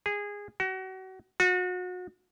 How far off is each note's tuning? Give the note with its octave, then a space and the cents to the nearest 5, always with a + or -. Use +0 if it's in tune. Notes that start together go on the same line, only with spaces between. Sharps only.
G#4 -20
F#4 +30
F#4 -35